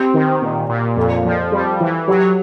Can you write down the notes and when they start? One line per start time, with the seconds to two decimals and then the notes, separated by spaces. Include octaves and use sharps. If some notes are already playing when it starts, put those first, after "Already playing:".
Already playing: C4 G4
0.14 D#3
0.42 A#2
0.69 A#2
0.96 F2 A4
1.25 F3
1.52 G3
1.80 E3
2.08 F#3 G4